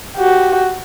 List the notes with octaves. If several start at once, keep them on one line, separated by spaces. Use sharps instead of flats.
F#4 G4